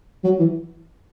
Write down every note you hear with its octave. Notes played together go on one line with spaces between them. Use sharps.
F#3
E3